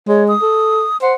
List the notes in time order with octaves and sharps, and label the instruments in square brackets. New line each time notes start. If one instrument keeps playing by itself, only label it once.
[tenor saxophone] G#3 [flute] C#5
[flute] D#6
[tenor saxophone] A4
[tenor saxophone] C5 [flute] F#5